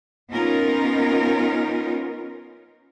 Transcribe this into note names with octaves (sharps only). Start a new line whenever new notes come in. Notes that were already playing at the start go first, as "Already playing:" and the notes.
B3 C#4 D#4 F4 A#4